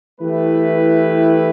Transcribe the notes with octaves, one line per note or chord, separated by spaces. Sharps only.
E3 A3 E4 G4 B4